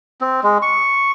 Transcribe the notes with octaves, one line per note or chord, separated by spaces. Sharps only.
C4
G#3
C#6